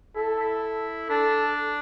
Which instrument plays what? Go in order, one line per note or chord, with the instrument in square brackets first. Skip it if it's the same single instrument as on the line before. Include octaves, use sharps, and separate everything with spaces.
[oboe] E4 [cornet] A4
[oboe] E4
[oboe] D4 [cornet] A4